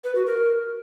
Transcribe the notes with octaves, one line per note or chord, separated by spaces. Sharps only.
B4
F#4
A#4